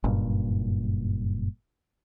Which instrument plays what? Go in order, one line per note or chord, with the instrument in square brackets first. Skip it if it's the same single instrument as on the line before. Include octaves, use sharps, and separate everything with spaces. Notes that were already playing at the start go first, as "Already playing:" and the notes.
[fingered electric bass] F#1 G2 A#2